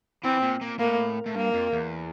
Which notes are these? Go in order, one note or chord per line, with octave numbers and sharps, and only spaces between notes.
E3 C4
A#2
A#2
A2 A#3
A2
G2 A#3
F2
E2